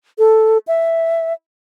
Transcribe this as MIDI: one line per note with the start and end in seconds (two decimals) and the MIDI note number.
0.19 0.58 69
0.67 1.33 76